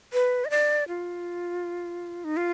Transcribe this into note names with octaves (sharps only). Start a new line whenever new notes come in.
B4
D#5
D5
F4
D#4
F4